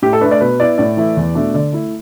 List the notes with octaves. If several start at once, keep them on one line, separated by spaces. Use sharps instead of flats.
A2 G4
A4
A3 D4 B4
D5
B2 B4
B3 E4 D5
A2 D5
E3 A3 E4
E2
B2 A3 D4
D3 D5
A3 E4